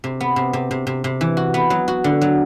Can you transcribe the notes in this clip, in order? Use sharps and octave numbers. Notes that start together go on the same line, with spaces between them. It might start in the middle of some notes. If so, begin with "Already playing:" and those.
C3
B3
C3
C3
C3
C3
C3
E3
F#4
B3
F#3
F#4
D3
F#3